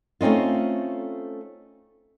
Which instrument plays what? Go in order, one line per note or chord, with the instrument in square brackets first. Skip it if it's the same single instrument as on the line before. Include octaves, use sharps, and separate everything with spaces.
[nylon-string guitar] A3 C4 C#4 D#4 F4